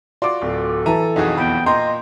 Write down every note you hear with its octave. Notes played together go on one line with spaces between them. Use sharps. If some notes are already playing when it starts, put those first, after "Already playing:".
F4 F#4 D5 C6 D6
D1 A4
E3 E5 A5 A#5 D#7
B1 F2 D#4 F#4 G#4
E2 G5 B5
A#2 D#5 G5 A#5 C6 G6